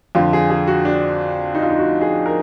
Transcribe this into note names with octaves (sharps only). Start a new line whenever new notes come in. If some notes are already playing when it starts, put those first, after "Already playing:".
F2 D3 F4
G#4
G#4
F#4
D4
D#4
F4
D#4
F#4
G#4
A#4